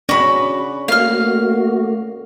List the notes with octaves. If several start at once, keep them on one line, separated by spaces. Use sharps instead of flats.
C#4 F#4 D5 B5
A3 A#3 F#4 F5 F6